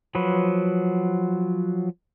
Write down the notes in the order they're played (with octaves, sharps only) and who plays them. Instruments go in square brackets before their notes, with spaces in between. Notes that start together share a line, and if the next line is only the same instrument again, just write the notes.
[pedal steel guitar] F3 F#3 B4